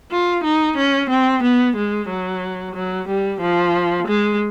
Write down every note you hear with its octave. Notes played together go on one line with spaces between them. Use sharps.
F4
D#4
C#4
C4
B3
G#3
F#3
F#3
G3
F3
G#3